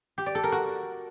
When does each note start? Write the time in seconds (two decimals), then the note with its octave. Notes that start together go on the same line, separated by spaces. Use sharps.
0.18 G4
0.26 D5
0.35 A4
0.44 A#4
0.52 F#4